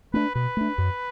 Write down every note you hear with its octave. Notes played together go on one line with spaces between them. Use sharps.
A3 D4 B4
B2 B4
A3 D4
F#2